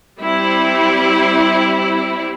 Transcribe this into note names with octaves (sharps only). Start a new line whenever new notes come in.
G3 C4 E4